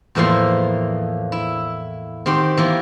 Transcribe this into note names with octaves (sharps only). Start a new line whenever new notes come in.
E2 A2 E3 F3 A#3 C6
E4
D#3 C4 G4 F#5 C6
E3 A#3 B3